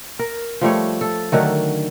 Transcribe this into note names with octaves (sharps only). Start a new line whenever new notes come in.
A#4
F3 G3 A3 C#5
A4
D3 D#3 F#3 A3